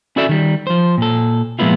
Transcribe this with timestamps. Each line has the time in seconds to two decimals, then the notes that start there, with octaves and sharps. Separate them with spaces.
0.16 C#4 E4 F#4 A4 D5 E5
0.29 D#3 G3
0.67 F3 C5
0.98 A#2 A4
1.59 A#2 F3 G#3 B3 E4 F4